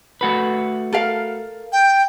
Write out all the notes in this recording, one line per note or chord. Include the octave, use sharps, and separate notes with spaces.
A3 F#4 B4
A4 A#4 F5
G5